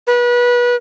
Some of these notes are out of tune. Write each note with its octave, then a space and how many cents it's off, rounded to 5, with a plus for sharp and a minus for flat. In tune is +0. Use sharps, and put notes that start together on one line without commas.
B4 -30